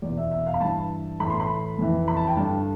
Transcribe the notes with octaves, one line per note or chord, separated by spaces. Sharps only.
E2 D5
B2
E5
E5
F5
B5
G2 E3 A5
A2 E3 B5
C6
B5
F2 E3
B5
A5
G5
G2 D3 A5